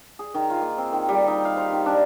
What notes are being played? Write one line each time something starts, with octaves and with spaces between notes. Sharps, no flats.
G#4
D#3
F4
A#3
C4
D#3
G3
D#4
F5
C5
D#3
D4